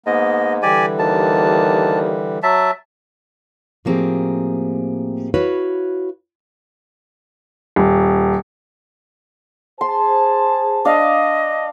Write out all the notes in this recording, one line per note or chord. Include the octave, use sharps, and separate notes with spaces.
G#2 A#3 B3 D#5
D3 E3 G3 G4 D5 G#5
D#2 A5
F#3 E5 A5
A2 F3 A#3 C4 G4 G#4
E4 F#4 B4 C#5 F5
D#1
G#4 C5 A5 C6
D4 D#5 F5